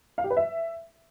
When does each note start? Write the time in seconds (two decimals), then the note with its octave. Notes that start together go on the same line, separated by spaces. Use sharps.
0.18 F5
0.24 G4
0.30 B4
0.37 E5